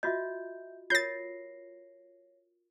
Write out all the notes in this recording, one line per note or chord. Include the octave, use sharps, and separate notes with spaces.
F4 F#4 D#5 E5 G6
F4 A#4 C#5 G6 A6 A#6 C7